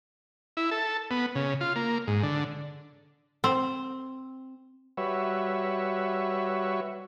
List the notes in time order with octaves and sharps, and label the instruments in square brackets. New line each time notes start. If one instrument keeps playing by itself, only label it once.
[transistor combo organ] E4
A4
B3
C#3
F4
A#3
G#2
D3
[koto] C4
[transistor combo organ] G3 F#4 B4 C#5 E5